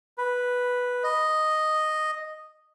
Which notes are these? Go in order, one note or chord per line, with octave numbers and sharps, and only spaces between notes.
B4
D#5